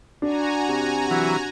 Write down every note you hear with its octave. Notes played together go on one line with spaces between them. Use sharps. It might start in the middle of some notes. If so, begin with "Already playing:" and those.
D4 F#4 G#5 A#5
C3
E3 F#3